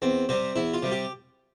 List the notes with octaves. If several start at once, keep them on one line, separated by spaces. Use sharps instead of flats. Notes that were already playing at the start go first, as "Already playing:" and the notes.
E2 C4
C3 G3 C4
E2 E4
F4
C3 G3
G4